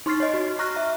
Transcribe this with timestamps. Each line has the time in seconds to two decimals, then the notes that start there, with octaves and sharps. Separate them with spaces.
0.06 D#4 C6 C#6 F6 A6 C7
0.20 C#5 D#5
0.34 F#4
0.59 A#5 C#6 F6 F#6 A#6
0.76 E5